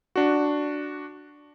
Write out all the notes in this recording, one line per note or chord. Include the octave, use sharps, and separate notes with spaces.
D4 F#4